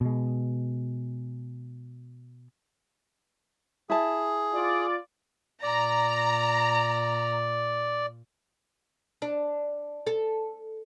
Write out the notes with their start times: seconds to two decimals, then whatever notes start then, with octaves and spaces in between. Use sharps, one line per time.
0.01 B2 G#3
3.90 E4 G#4 A5
4.53 F4 D5
5.63 A#2 D5 A#5
9.22 D4
10.07 A4